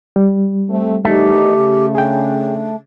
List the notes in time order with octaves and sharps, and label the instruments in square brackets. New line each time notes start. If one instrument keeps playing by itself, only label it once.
[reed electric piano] G3
[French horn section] A3 C4
[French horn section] E2 D#3 D#4 [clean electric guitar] A3 [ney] G4
[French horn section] C#3
[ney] D4 [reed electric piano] G#4 G5